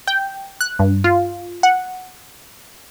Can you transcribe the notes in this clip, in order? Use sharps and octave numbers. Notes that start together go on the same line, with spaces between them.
G5
F#6
G2
F4
F#5